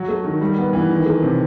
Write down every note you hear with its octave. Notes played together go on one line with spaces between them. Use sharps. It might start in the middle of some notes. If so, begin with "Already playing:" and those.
Already playing: F#3
A3
D#3
G3
B3
E3
D#3
A3
C3